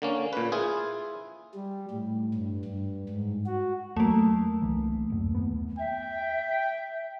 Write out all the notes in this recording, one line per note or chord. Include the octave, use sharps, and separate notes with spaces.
D3 A#3 C#4
A#2 B4
E4 F4 G#4
G3
A2
G2
G2
G#2
F#4
E2 F#3 A3 A#3
C2 E3
D1 F#2
D#2 B3
E5 G5